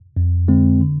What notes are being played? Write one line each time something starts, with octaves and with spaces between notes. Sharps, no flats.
F2
D3 G#3 C4
D3